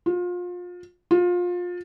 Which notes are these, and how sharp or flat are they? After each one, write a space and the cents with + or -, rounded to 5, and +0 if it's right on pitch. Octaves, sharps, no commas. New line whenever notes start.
F4 +30
F4 +25